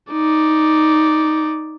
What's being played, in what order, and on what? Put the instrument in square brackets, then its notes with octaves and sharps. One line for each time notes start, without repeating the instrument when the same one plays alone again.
[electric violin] D#4 D5